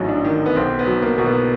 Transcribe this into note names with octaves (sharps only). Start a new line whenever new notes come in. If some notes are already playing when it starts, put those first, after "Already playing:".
Already playing: A1 G#2 F#3 D#4
D4
D#3
B3
B1 C4
B3
F#3
A#3
B2
B3